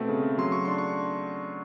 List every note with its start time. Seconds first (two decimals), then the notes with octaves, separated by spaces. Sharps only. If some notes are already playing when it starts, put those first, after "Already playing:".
Already playing: B2 A3 C4
0.09 C#3
0.38 F#3 C6
0.52 C#6
0.65 D4 C6
0.78 C#6